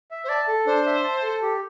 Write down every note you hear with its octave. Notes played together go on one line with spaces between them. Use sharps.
E5
C5
D5 A5
A4
D4 C5
E5
A5
A4
G4